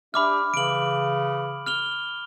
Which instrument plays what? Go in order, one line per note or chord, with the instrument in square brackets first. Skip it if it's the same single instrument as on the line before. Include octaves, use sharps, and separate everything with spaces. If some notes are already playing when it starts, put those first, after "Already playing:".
[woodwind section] D4 G4 E5 [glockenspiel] B5 D6 F6
[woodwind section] C#3 E3 [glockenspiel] D7 F#7
[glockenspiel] F6 F7 G7